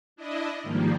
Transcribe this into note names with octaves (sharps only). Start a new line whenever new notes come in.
D4 E4 D#5
G#2 D#3 F3 G3 A#3